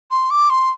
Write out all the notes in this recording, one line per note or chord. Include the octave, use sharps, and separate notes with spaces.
C6
D6
C6